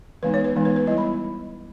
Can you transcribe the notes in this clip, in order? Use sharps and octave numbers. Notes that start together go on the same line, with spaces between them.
E3 G#3 B3 D#4 B4
C#5
B4
E3 G#3 B3 D#4
B4
B4
G3 B3 E4 D#5
B5